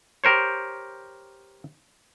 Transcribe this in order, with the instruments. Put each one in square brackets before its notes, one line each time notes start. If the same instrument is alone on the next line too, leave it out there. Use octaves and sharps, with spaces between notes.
[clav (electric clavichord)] G4 A#4 C5 C#5